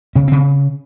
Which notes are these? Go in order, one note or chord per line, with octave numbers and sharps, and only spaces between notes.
C#3 C#4
C#3 C4